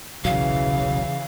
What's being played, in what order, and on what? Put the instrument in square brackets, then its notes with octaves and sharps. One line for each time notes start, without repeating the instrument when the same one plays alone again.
[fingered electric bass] D#1 B1 F#3 [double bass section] C#3 E3 [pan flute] F5